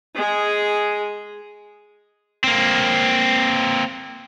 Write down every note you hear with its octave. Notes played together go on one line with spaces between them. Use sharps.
G#3 G#4
A#3 C4